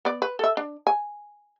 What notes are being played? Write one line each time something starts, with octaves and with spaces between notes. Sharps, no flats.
B3 D5
B4
A4 E5
D4
G#5